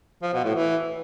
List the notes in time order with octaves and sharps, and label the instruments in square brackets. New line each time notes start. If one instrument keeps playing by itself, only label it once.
[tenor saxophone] F3
B2
A2
E3